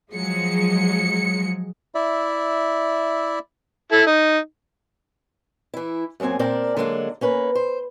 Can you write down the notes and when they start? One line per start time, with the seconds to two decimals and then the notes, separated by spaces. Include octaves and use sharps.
0.12 F3 F#3 G#3 C#7
1.95 E4 D5 E5
3.92 E4 A4
4.07 D#4
5.74 E3 E4
6.20 F#2 F#3 A#3 C4 G#5
6.39 A#2 C4 D4 A#4 D5
6.77 D3 F#3 G#3 A#3 C4 D4
7.21 A#3 C#4 B4
7.55 C5